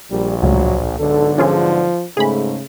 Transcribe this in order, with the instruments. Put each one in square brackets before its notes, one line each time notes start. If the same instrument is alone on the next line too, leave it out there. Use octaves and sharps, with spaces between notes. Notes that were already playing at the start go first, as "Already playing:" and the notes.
[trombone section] A#1 [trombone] G3
[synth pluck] C#2 A2 [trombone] F#3
[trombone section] B1 G#2 D3 [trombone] A4
[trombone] F3 [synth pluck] C#4 F4 G#4
[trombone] G#2 [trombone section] C#3 A3 [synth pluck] G#4 B5